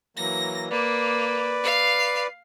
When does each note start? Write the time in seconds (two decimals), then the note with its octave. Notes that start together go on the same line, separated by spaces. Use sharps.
0.17 E3 F#3 A#3 A#6
0.71 A#3 B4 D5
1.63 F5 C7